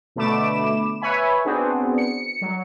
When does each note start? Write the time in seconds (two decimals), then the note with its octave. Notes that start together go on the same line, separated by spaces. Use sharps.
0.16 B2 D3 A3 B5 D6 E7
1.01 B4 C#5 E5 G#5 B5
1.45 B3 C4 D4 F#4 G#4
1.98 C#7
2.41 F#3